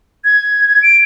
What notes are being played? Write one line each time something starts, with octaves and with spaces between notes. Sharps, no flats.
G#6
D7